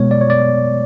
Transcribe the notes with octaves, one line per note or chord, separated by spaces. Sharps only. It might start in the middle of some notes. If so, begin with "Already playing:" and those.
Already playing: B2 G#3 B3 C#5
D5
C#5
D5